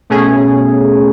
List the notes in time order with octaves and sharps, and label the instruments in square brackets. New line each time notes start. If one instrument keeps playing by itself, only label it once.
[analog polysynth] B2 A3 C#4 G#4